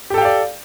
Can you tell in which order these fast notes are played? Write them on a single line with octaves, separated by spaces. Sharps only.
G4 A4 G5 F5 D5